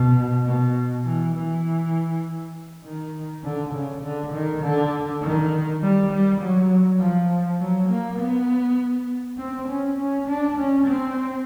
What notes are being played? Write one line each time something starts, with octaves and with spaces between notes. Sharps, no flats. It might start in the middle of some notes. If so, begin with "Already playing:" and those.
Already playing: B2
B2
E3
E3
D#3
D3
C#3
D3
D#3
D3
D#3
G3
G3
F#3
F3
F#3
A#3
B3
C4
C#4
C#4
D4
C#4
C4